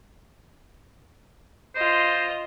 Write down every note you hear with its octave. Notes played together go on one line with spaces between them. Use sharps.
F4 C5 D#5